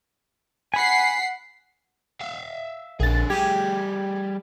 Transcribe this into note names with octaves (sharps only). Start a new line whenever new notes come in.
F#5 G#5 B5 B6 C7
E5 F5
A#1 D3 G#4 A6
G3 G4 G#4 G#6